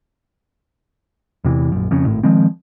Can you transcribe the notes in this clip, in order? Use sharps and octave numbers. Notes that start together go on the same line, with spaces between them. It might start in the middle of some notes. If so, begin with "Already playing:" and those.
E2 C3 E3
A#1 F#2
F2 C#3
G#1 A2
D#3 F3 G#3 C4